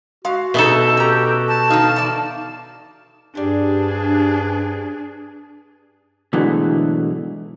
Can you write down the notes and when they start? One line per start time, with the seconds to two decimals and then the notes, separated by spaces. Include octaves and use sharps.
0.25 G#3 F#4 F5
0.54 B2 D#4 G#4 A4 E5
0.97 C#4 G4 A#5
1.48 A5
1.70 D#3 D#4 F5
1.96 E2 D5
3.35 G2 C3 G3 D4 G#4
6.33 G#2 B2 D3 E3 F#3 A3